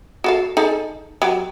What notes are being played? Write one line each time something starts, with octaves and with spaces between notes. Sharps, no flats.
F#4 A4 F5
D#4 G#4 A4
F#3 G4